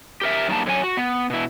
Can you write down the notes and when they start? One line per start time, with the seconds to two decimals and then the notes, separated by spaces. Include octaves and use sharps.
0.21 G4 A#4 E5
0.48 F#2 D#3 G3 A#3 A5
0.66 D3 F#3 C#5 G#5
0.84 F#4
0.97 B3
1.30 B2 E4